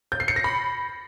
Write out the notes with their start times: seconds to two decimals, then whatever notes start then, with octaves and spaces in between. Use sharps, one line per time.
0.12 G6
0.20 C7
0.28 C#7
0.36 A#6
0.44 B5